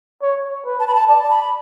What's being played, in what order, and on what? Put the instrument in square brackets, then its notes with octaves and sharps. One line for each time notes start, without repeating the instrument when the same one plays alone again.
[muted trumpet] C#5
B4
[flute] A5
B5
A5
[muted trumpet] D5 [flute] A5
[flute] B5